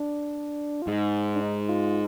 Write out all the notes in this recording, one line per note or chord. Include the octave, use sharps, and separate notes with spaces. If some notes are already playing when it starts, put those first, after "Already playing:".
Already playing: D4
F4
G#2 D#4
D4
D#4
F4